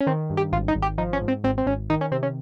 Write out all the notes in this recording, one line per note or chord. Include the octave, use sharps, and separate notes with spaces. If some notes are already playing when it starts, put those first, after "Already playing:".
C#4
D#3 C4
G2
G4
G#1 F4
D#4
G#1
G4
F3 D#4
C#4
G#2
C4
G#1 C4
C4
G#1 C#4
D#3 D#4
C#4
C3 C4
C#4